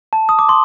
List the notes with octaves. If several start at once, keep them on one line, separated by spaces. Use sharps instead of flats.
A5
D#6
D6
C6